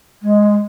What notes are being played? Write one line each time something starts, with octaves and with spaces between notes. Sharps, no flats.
G#3